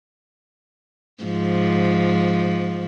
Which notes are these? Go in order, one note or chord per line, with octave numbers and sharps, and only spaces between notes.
G#2 F3